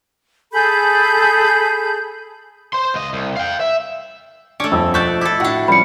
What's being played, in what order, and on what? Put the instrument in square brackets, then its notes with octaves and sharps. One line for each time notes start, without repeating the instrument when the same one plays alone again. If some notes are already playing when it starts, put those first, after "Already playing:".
[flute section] G#4 A4 B5 G6
[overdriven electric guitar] C5 C6
C#2 D#5
C2
F5 G5
E5
[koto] A3 C#4 [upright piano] D4 [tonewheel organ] C#6 D6
[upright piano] D#1 F2 E6 [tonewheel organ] F3
[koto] B2 D5 E5 [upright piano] C#6 F#6 G6
[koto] E4 A4 [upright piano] D6
[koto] A2 D4 [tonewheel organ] E4 F#4 [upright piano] F#5
[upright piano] F3 G3 C#4 [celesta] B5 C#7